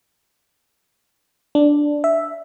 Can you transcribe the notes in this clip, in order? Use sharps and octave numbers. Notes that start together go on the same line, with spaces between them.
D4
E5